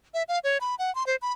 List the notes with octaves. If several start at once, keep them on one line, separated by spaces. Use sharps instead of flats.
E5
F5
C#5
B5
F#5
C6
C5
B5